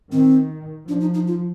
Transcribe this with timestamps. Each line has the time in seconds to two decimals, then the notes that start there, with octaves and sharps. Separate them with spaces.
0.12 D#3 C4
0.88 F3 D4
1.01 D#4
1.14 D#4
1.27 F4